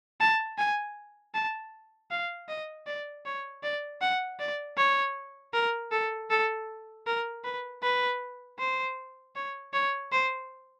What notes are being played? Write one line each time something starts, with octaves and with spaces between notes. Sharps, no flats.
A5
G#5
A5
F5
D#5
D5
C#5
D5
F#5
D5
C#5
A#4
A4
A4
A#4
B4
B4
C5
C#5
C#5
C5